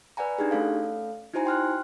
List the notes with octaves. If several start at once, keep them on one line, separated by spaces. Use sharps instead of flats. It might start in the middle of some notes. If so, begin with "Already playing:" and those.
B4 D5 F#5 G#5 A#5
D4 D#4 G4 G#4
A3 C#4 A4 F5
D#4 E4 F#4 C5 G#5 A#5
G5 C6 F6 F#6